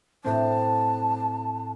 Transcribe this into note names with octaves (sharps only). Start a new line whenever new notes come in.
A2 C4 A5